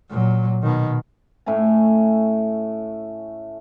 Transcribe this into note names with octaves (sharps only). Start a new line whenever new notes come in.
A#2 F#3
B2 D#3
A2 A3 C#4 G#5